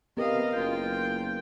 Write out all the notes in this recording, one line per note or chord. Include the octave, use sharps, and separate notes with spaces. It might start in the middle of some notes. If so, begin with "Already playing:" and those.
C3 B3 A#4 B4 D#5 F5
F#1 F4 G5